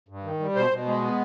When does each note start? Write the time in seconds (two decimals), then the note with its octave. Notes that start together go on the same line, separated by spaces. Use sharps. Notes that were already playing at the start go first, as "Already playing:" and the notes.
0.09 G2
0.24 D#3
0.40 G3
0.55 B2 C5
0.71 B2
0.86 G#3
1.01 B3